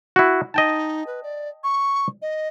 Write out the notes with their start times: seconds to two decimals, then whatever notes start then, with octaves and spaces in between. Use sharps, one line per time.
0.16 E4 F#4
0.54 D#4 D#5 G5 A5
1.07 B4
1.23 D5
1.64 C#6
2.22 D#5